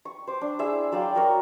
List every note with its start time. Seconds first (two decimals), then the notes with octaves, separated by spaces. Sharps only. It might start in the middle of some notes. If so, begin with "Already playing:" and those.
0.05 C#6
0.27 C5 D6
0.41 D4
0.59 E4 G#4 E5
0.92 F#3 D5 F5 G5
1.15 F#4 A#4 C#5